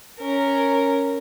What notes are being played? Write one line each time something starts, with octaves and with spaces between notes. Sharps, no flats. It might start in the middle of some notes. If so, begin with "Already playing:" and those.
C#4 A#4